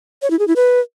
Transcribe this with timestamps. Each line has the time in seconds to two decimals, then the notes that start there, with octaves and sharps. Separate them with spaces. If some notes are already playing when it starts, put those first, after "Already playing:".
0.22 C#5
0.31 E4
0.39 G#4
0.48 E4
0.56 B4